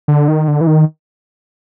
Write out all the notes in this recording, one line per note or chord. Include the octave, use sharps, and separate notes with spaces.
D3
D#3
D3
E3
D#3